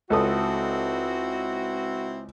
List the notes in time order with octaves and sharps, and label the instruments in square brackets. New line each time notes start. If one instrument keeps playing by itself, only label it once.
[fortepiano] C#2 A4 D#6 [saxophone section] C4 E4 F#4